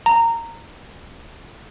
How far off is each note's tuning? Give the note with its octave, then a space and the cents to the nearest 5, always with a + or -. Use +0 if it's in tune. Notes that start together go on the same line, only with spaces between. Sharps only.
A#5 -15